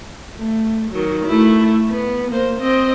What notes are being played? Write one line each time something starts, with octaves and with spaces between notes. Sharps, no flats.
A3
D#3 F#3
A3 E4
B3
A#3 C5
C4 D#5